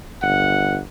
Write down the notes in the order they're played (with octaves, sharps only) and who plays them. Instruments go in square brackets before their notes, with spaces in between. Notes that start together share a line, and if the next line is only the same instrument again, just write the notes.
[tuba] G1 [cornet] F#5